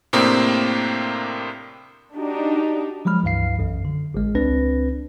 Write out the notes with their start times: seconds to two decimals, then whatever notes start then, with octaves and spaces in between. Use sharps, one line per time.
0.13 A2 C3 A#3 C4 D4
2.15 D4 D#4 F#4 G4
3.05 F3 F#3 G#3 B5 F6
3.23 C#2 G2 E3 F5 C7
3.59 B1 F#2
3.85 D3
4.14 A1 G#3
4.35 C#2 C4 D4 B4 A#6